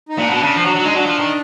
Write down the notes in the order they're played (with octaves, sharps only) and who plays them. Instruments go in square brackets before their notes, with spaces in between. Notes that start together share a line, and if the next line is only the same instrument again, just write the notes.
[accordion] D#4
[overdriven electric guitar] A#2 [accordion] D4
[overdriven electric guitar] B2
C#3
F3
F#3
F#3
[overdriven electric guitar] G#3 [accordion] D#4
[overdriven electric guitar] F#3 [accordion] D4
[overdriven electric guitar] F3
D#3